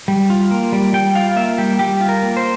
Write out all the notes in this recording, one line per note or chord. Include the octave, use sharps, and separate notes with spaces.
G3
F4
A#3
G3
G3 G5
F4 F5
A#3 E5
G3 G4
G3 G4
F4
A#4
A#3
C5